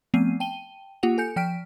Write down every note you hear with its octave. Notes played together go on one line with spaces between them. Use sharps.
F3 A3 B3 C4 C7 D#7
G5 A5 D#7 G7
A#3 F4 G4 F#5 F7
A4 G#5 G6 C#7
F3 G5 F6 B6 D7